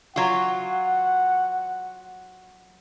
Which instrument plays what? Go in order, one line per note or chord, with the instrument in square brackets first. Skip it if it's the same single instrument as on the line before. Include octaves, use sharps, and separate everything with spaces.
[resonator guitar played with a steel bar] F#3 F4 [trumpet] F#5